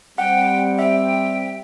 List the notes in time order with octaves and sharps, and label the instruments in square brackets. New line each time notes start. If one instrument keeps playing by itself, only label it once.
[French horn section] G3 C4 [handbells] F#5 [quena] G5
[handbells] E5 [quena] G5